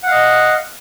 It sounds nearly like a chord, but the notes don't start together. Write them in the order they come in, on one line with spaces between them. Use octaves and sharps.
F#5 F5 D#5